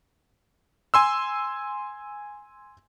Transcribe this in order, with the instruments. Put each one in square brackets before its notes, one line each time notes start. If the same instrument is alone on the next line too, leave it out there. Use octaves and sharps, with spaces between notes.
[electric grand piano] G#5 C6 E6